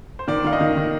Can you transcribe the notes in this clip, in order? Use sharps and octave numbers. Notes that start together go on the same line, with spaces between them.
C5
D#3 D5
D#3 F5
D#5
D#3
D#3